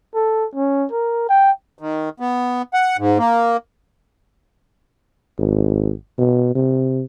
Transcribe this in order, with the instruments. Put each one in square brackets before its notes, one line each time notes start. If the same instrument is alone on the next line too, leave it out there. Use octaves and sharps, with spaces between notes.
[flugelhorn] A4
C#4
A#4
G5
[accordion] D#3
B3
F#5
G#2
A#3
[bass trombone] G#1
B2
C3